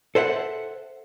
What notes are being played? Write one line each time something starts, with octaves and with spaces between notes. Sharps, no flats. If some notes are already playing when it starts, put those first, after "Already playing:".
A4 C5 E5 F#5